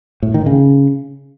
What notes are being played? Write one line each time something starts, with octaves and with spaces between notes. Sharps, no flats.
A2
D#3
C#3